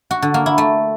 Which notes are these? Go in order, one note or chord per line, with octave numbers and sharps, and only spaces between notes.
F#4
D3
A#3
E4
A3